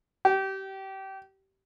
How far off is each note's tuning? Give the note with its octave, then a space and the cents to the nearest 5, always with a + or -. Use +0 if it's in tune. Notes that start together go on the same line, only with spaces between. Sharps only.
G4 -25